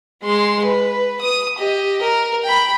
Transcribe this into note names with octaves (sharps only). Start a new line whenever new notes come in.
G#3 C6
B4
D#6
G4 D#5
A#4
G5 B5